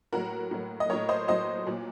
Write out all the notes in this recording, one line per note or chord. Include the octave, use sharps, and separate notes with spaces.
A2 F#3 F#4 A#4
A2 F#3
D#5
A2 F#3 A#4 C#5
C5 D#5
A2 F#3 C5 D#5
A#2 F#3